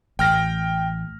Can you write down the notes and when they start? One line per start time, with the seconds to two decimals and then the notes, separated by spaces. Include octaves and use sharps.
0.19 A1 G5 F6 A#6